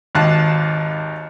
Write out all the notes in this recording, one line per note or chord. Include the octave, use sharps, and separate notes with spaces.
G#1 D#2 F5 A5 F#6